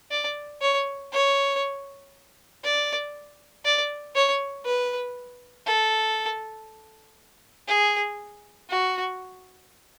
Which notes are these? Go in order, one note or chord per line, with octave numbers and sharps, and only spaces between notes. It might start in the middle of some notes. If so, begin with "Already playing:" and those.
D5
C#5
C#5
D5
D5
C#5
B4
A4
G#4
F#4